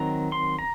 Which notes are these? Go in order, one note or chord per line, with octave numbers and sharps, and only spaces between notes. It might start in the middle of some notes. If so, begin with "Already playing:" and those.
Already playing: D#3 F#3 C4 A#5
C6
A#5